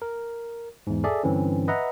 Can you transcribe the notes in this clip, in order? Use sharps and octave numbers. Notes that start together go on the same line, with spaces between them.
A#4
E2 G#2
G#4 A4 D5 E5
G2 D3 E3 C4 C#4
B4 D#5 E5 F#5 A#5